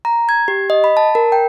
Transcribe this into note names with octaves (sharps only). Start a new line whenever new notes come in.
A#5
G#6
G4
D#5
B5
A5
A#4
G5